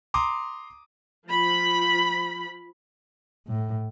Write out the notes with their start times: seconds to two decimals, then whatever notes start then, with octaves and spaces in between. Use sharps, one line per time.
0.14 A#5 C6 D6 D#6
1.27 F3 B5
3.48 A2